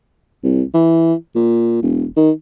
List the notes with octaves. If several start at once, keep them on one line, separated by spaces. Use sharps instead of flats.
C2
E3
A#2
E1
D#3